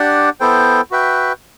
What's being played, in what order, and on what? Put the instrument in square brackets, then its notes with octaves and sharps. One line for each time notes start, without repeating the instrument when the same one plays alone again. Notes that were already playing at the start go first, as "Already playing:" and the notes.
Already playing: [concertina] D4 G4 D5 F#5
B3 E4 A4 C5 G5
F#4 B4 E5 G5